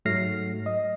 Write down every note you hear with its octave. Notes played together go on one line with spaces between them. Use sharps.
G#2 F#3 A3 F6 A#6 C7
D#5